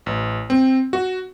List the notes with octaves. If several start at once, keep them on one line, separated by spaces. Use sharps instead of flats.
A1
C4
F#4